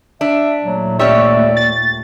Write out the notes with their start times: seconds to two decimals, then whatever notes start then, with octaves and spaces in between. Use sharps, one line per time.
0.21 D4 E5
0.64 D#2 A#2 F#3 A3
0.99 C#4 G4 C#5 D5 E5
1.57 A6